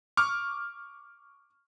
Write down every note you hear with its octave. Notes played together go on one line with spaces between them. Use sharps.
C#6 D6 F6